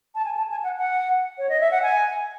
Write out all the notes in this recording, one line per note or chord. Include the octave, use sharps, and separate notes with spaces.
A5
G#5
A5
G#5
F#5
F#5
C#5
D#5
E5
F#5
G#5